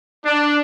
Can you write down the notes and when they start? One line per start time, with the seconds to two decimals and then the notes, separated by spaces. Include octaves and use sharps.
0.23 D4